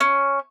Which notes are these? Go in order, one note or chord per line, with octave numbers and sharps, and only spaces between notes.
C#4